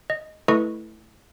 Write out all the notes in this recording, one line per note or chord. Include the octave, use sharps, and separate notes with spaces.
D#5
A3 E4 A4 B4 D#5 C#6